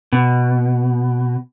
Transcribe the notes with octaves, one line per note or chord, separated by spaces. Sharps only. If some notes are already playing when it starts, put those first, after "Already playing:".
B2